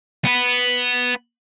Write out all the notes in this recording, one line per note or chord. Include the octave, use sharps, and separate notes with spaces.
B3 B4